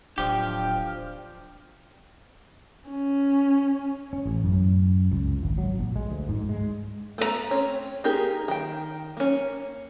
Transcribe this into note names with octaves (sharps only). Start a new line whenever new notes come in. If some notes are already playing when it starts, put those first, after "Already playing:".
D1 F3 D4 G4 G5 F6
C#4
C#4
A1
F#2
C#2
G#1
F#3
A#1
G#3
D2
G#2
G#3
A3 B3 G#4 A#5
C4 C#4 C#5
A#3 D#4 G4 G#4 A#4
D#3 G5
A#3 C#4